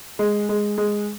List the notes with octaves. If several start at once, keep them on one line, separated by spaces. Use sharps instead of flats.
G#3
G#3
G#3